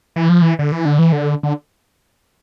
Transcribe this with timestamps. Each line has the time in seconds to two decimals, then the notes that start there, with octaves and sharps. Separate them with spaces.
0.16 E3
0.29 F3
0.42 E3
0.59 D3
0.72 E3
0.85 D3
0.99 E3
1.12 D3
1.43 D3